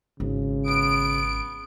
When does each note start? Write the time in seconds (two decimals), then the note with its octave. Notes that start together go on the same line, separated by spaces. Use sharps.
0.20 G#1 C#3
0.66 B3 D7